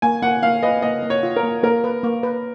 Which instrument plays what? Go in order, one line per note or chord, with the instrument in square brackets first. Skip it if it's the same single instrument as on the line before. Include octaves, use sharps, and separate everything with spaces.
[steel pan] A#3 [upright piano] G#5
[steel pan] A#3 [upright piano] F#5
[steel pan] A#3 [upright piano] F5
[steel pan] B4 [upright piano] D#5
[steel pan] A#3 [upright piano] D#5
[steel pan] A#3
[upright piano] C#5
[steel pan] F4
[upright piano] A#4
[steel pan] A#3
[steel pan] A#3 [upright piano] A#4
[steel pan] B4
A#3
B4